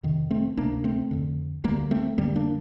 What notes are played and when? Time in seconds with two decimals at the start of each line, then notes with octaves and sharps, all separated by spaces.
0.03 F2 C3 D#3
0.30 A3 C4
0.57 D2 C3 A#3 D4
0.84 A3 C4
1.11 F2 D3
1.64 D2 D3 G3 A#3
1.91 A3 C4
2.18 F2 D3 G3 A#3
2.36 A#3 D4